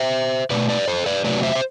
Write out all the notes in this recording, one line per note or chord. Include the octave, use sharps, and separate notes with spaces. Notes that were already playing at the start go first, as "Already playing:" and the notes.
Already playing: C5 E5
B2 A3 B4 D5
B4 D5
A4 C5
B4 D5
C3 F#3 A3 B4 D5
C5 E5
C5